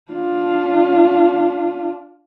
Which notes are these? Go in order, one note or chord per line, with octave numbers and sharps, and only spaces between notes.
D4 F4